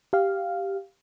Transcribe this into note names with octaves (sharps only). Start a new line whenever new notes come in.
G4 F5